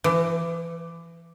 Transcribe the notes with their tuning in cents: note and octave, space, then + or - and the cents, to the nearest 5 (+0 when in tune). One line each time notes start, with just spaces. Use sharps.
E3 +30